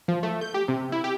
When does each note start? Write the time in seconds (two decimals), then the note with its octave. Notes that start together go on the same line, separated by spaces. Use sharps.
0.08 F3
0.23 A3
0.41 G6
0.54 G4
0.68 C3
0.92 E4
1.04 G4